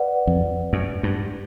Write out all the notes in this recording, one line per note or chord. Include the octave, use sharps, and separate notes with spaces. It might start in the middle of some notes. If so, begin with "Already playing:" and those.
Already playing: B4 D5 F#5
F2
F#2
G2